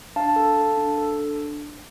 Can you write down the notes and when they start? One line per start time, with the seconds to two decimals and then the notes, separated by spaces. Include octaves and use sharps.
0.16 D4 F5 A5
0.36 A4
0.57 A4
0.77 D4
0.98 A4
1.19 D4